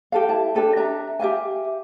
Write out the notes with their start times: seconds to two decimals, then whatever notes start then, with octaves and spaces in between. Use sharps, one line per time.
0.12 G4 A4 F5
0.29 E4 A5
0.55 D4 G4 A4 B4
0.76 D4 E5 A#5
1.19 G4 E5 F5 G#5